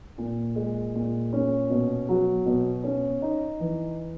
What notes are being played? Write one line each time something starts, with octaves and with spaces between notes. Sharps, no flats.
A#2
G#3
A#2
C#4
B2
F#3
B2
C#4
D#4
E3